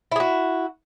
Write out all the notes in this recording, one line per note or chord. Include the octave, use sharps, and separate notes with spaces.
E4 F#4 G#4